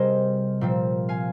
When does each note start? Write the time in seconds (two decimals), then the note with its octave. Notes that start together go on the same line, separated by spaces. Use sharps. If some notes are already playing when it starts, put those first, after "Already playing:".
Already playing: C3 G3 C4 G#4 A#4 C5 D#5
0.61 A#2 F3 C4
1.09 F5 G#5